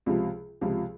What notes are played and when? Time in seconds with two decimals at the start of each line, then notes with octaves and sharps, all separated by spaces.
0.06 C#2 C3 F3
0.61 C#2 C3 F3